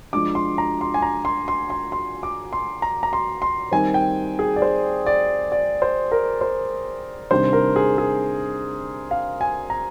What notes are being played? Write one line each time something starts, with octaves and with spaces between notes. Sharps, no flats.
F3 G#3 D4 D6
C6
A#5
C6
G#5
A#5
C6
C6
C6
C6
D6
C6
A#5
A#5
C6
C6
D#3 G3 C4 D#4 G#5
G5
G#4
D5
C5
D5
D5
C5
A#4
C5
C3 D#3 G3 D4 C5
A#4
G#4
G#4
F5
G#5
A#5